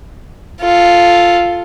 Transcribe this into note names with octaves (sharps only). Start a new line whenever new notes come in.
F4 A4